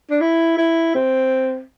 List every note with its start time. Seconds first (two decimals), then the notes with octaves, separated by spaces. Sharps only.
0.10 D4
0.21 E4
0.57 E4
0.95 C4